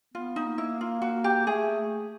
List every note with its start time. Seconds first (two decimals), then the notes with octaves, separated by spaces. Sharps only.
0.14 B3 F4
0.36 D#4
0.47 A#3
0.58 E4
0.81 F4
1.02 F#4
1.24 G4
1.47 A3 G#4